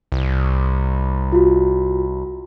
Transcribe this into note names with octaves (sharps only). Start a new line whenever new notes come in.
C2
F4 F#4